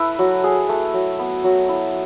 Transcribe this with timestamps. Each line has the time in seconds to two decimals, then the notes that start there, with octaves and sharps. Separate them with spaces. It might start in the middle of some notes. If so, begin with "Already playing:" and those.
Already playing: E4 A4 B4
0.19 F#3
0.44 G#4
0.69 A3
0.94 F#3
1.19 B3
1.44 F#3
1.69 E4